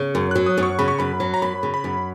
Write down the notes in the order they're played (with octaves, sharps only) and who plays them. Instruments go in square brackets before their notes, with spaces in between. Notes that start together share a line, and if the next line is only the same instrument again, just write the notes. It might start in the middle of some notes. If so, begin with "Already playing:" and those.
Already playing: [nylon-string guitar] C#3
F#2
[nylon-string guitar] F#3 [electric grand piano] F#6
[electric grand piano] D#6
[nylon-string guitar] F#2
[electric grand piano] C#6
[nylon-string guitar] C#3 [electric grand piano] B5
[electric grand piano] C#6
[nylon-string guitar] F#2 [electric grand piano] B5
[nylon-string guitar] F#3
[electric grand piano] A#5
[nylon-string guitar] F#2 [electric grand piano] B5
[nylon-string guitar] C#3
[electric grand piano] B5
[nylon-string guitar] F#2